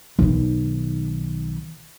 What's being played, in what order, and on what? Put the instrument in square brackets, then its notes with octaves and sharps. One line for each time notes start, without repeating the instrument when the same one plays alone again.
[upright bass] B1 D#3